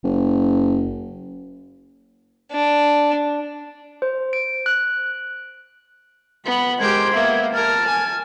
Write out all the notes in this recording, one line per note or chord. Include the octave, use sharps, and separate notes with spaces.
F#1
D4
C5
D7
F#6
B3 B5
G#3 G4 A#4 C5 G#6
A#3 B3 E5
A#4 A5 F6
G#5